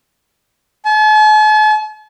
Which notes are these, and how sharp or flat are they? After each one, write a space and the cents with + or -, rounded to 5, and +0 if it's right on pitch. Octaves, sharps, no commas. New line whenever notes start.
A5 -45